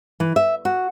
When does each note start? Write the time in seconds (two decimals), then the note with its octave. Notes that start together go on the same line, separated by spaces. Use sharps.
0.20 E3
0.36 E5
0.65 F#4